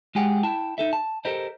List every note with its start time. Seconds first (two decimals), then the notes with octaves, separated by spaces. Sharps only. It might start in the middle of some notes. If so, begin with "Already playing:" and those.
0.15 G#3 F4 G4 G#4 F#5 G5
0.43 E4 G5 A5
0.78 D#4 A4 E5
0.93 A5
1.25 G4 A4 A#4 C5 D#5